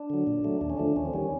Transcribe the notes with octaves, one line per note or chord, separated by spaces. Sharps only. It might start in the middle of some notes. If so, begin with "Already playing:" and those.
Already playing: D4
D3 F#3
A#2
F#3 A3
D#2 D4
C#4
D3 F3 A3 D4
D#2 C#4
C4
D#3 G3 C#4